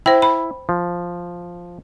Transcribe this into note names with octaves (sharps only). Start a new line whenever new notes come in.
E4 C5 G5
B5
F3